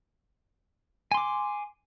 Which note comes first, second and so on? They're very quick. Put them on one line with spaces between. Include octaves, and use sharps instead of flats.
G#5 C6 D6